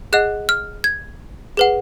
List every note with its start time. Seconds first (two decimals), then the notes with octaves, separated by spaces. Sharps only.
0.13 G#4 D#5 F#5 F#6
0.49 F6
0.84 G#6
1.57 G#4 B4 F#5